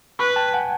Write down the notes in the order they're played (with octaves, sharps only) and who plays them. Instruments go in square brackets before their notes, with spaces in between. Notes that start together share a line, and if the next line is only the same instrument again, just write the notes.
[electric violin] B4 [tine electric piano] B5 C#6
[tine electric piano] G5 A5
F#5 G#5